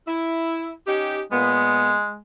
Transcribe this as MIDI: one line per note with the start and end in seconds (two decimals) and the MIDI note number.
0.07 0.73 64
0.87 1.21 61
0.87 1.21 63
0.87 1.21 67
1.32 1.94 46
1.32 2.20 56
1.32 1.94 59